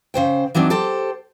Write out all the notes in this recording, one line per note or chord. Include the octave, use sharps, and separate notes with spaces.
C#3 C5 G5
E3 F#3 C4 D4 D#4
G4 A4 C5